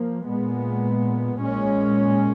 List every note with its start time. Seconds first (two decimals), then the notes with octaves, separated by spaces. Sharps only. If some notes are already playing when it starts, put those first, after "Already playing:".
Already playing: F3 A#3
0.26 A#2 G#3 B3
1.40 A#2 G#3 C#4